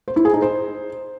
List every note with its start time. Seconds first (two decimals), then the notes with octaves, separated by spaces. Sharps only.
0.08 C5
0.16 E4
0.25 G#4
0.34 D#4
0.42 C5